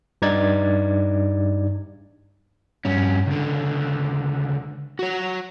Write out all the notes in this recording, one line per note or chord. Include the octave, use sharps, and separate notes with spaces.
G2 D#4 D5 G#6 A6
G2 C#4
C#2 D3
F#4 C#5